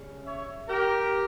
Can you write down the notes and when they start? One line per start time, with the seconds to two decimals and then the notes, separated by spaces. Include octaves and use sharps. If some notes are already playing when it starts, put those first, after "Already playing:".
Already playing: C#3 G3 C#4
0.25 C#5 E5
0.67 G4 A#4